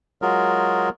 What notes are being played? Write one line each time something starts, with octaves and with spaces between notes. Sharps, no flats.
F#3 G#3 F4 F#4 G#4 A#4